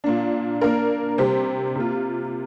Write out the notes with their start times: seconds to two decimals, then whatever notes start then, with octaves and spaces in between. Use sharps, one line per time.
0.04 A#2 A#3 D4
0.61 A#3 D4 A#4
1.18 C3 G3 C4 G4 C5
1.75 C3 A#3 F4